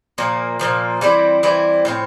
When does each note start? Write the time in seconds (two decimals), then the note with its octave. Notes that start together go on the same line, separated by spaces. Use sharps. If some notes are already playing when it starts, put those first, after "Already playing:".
0.18 A#2 F3 A#3
0.59 A#2 F3 A#3
1.01 E3 G3 C4 E4
1.43 E3 G3 C4 E4
1.85 A2 F3 C4